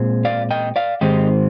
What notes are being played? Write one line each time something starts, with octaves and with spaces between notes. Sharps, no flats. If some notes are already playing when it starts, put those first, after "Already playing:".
Already playing: A#2 G#3 C4
D5 F5
D#5 G5
D5 F5
G#2 D#3 G#3 C4 D#4 G4